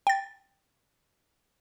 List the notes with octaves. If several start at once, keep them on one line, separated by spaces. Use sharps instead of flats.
G5 A6